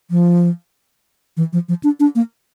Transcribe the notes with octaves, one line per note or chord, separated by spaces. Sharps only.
F3
E3
F3
F3
D4
D4
A#3